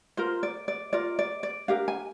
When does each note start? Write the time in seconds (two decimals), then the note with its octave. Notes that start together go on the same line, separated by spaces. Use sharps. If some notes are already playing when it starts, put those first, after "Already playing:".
0.17 F4 A#4 C5
0.43 D5
0.68 D5
0.93 F4 A#4 D5
1.19 D5
1.43 D5
1.68 D4 G4 A#4 F5
1.88 G#5